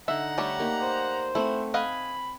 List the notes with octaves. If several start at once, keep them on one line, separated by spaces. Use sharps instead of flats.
D3 D#4 E5 F#5 A#5
G3 A3 G4 C#5 E5
A#3 D#4 G4
C5
A3 C4 E4 F#5
D#5 F5 F#5 G#5 B5